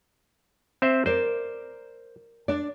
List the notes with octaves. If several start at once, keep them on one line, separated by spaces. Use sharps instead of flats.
C4 C5 E5
A#4 C5 D5
D4 D5